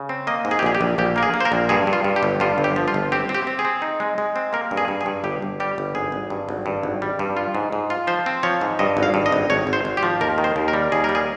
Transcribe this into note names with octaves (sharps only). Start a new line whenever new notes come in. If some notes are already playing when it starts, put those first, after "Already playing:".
Already playing: C#3
C4
A#3 D#5
G#2
G#4
G4
A#1 G#4
G4
A#1
A#1 G4
A#3 A#4
G#4
A#3
C5
A#4
A#1
G2 G#4
G2
F4
G2
G4
G1
G2 F4
G1
G4
F3
F4
G1
C4 G4
C4
G4
C4
G#4
C4
D#4
G#3
G#3
C4
A#3 A#4
G2
G#4
G2
G#4
G2
G1 G4
G1
G3 G4
G1
G#1 G#4
G#1
G2
G#1
G2
G#1
G3
G2
F4
G#2
G#2
F4
F3 C5
C4
F3 C#5
G#2
G2 D#5
G#1
F5
G2
D#5
G#1
G#1 C#5
G#1
C5
G#1
G4
F3
D#2 A#4
D#3
C5
D#2
A#4
G3
D#2 G#4
A#4
G3
G#4